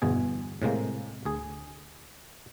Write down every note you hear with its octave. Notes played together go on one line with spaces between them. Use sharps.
G1 E2 B2 G#4
A2 C3 G#3 A#3
D2 G#4